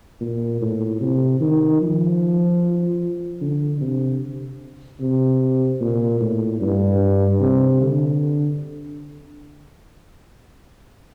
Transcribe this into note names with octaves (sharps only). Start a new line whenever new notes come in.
A#2
A2
C3
D#3
F3
D3
C3
C3
A#2
A2
G2
C3
D3